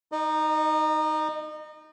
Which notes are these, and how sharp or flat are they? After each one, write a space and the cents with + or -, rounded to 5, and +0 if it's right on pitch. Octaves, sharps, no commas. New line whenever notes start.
D#4 +0 D#5 -35